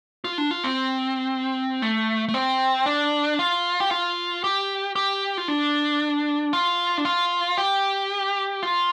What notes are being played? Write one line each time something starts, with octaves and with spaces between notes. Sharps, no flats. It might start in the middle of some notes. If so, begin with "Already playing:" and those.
F4
D4
F4
C4
A3
A3
C4
D4
F4
G4
F4
G4
G4
F4
D4
F4
D4
F4
G4
F4